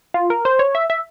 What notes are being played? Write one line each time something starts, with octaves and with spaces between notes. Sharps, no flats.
F4
A#4
C5
C#5
E5
E5